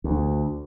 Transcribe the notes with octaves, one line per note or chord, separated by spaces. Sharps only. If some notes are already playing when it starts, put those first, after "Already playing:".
D2